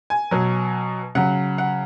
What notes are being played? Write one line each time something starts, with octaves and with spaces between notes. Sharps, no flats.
G#5
B2 F#3
C#3 F#3 F#5
F#5